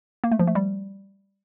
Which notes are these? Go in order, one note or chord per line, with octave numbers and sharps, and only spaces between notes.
A#3
A3
F3
A3
G3